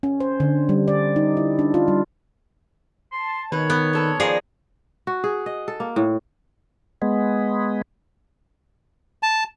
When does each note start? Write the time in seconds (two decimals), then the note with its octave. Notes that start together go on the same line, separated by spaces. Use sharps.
0.03 C#4
0.20 C5
0.40 D3
0.69 G3
0.88 D5
1.16 D#4
1.37 E4
1.59 D4
1.74 F4
1.88 G3
3.12 A5 C6
3.52 B2 D#3 B4 C#5
3.70 B3
3.93 A#2 A4 B4
4.20 D#3 F3 G#4 A#4 D5 A#6
5.07 F#4
5.24 G#4
5.46 D#5
5.68 A4
5.80 A#3
5.96 A2
7.02 G#3 B3
9.23 A5